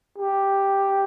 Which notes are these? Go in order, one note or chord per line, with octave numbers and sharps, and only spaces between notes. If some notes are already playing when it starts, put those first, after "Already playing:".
G4